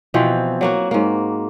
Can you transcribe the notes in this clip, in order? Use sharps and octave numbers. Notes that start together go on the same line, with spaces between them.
B2 E3 F3 C4
F#3 A#3 F#4
G#2 A#3